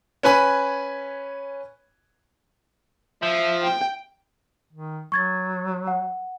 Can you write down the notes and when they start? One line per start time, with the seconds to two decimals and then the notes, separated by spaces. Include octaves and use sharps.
0.23 C#4 B4 G#5 B5
3.22 F3 E5
3.64 G5
4.72 D#3
5.12 F#3 C#6 G#6 A6
5.87 F#5